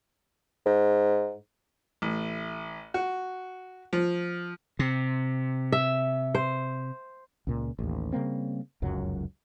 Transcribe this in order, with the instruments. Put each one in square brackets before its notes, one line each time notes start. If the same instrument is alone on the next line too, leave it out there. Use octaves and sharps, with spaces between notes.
[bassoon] G#2
[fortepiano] A1
F#4
F3
[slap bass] C3
[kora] E5
C5
[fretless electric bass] C#2 A#2
A1 D#2
C#3 G3 A#3 C4
F1 C#2 F#2 F#3